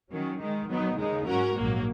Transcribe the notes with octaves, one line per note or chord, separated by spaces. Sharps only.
D#3 F#3 C#4
D#3 G#3 D#4
D#3 F#3 B3 D#4
D#2 C#3 G#3 D#4
G#2 F#3 C#4 F#4 A#4
A#1 G#2 F#3 A#3